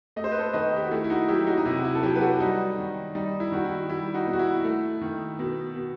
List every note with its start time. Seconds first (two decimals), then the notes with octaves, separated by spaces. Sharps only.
0.16 A3 D#5
0.24 C5
0.32 B4
0.39 A4 C5
0.53 D#3 B4 D#5
0.76 G4
0.84 F#4
0.91 A3 E4
1.04 E4
1.10 D#4 F#4
1.28 F#3 E4 G4
1.47 D#4 F#4
1.57 D#4
1.65 C3 E4
1.78 F#4
1.84 E4
1.95 A4
2.03 F#3 E4 G4
2.15 B4
2.21 F#4 A4
2.40 G3 D#4 F#4
2.78 D#3
3.15 G3 D#4
3.40 E4
3.52 D#3 F#4
3.64 E4
3.89 G3 E4
4.14 D#4 F#4
4.27 B2
4.33 F#4
4.39 E4
4.64 A3
5.01 D#3
5.39 B2
5.76 B2